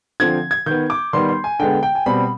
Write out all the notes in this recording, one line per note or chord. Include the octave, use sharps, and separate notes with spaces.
D3 F3 C4 G#6
G#6
D#3 B3 G6
D6
D#3 G3 B3 C6
C6
G#5
D3 G#3 B3 G5
G5
G#5
B2 G3 C4 B5